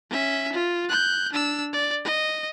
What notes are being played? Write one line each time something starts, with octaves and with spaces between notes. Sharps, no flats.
C#4 E5
F4
F#6 G6
D4 E6
D5
D#5